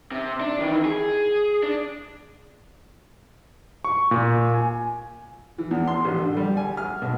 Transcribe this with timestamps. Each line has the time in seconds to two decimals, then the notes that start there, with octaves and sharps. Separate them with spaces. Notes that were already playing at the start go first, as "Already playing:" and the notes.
0.11 C3
0.40 D4
0.59 D#3 E3
0.85 G#4
1.63 D4
3.85 C#6
4.11 A#2
4.54 G#5
5.58 E3
5.71 E2
5.88 C6
6.05 A1
6.19 D3
6.37 G3
6.57 G#5
6.77 F6
7.02 B1